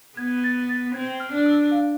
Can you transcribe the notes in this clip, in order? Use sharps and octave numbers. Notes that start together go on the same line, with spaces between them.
B3 G#6
A6
A6
C4 G#6
F6
D4
E6
F5